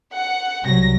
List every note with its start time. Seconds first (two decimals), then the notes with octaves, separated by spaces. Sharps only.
0.15 F#5
0.65 C2 F#3 A#6